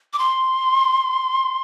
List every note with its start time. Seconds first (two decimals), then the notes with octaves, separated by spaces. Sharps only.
0.13 D6
0.19 C6